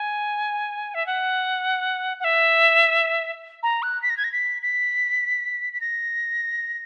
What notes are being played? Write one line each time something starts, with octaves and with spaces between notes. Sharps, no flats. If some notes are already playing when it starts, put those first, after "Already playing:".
Already playing: G#5
E5
F#5
F#5
E5
A#5
F#6
B6
A#6
G#6
A#6
B6
B6
B6
A#6